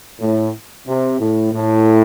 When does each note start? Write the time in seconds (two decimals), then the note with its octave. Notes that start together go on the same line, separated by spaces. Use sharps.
0.20 A2
0.87 C3
1.19 A2
1.53 A2